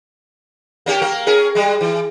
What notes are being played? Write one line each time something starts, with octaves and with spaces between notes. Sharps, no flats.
A#3 C#4 G4
A#3 A#4
C#4 G#4 A#4
G3 G#3
E3